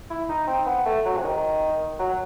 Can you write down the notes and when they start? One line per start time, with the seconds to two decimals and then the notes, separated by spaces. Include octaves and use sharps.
0.10 E4
0.29 D#4
0.47 C4
0.66 B3
0.86 A3
1.05 F#3
1.18 C3
1.24 D#3
1.99 F#3